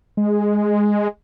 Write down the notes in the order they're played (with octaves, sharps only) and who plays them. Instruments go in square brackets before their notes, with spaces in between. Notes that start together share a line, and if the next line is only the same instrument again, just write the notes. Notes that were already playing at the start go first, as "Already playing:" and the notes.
[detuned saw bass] G#3